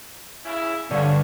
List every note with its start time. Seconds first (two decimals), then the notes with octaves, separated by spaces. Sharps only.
0.44 C#3 E4
0.91 G2 D3 C#4 C#5 D5 F5